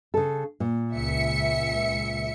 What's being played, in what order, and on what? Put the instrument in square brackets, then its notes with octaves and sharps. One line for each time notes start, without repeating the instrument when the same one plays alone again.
[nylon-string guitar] C#3 A4
A#2
[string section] C#2 E5 C#7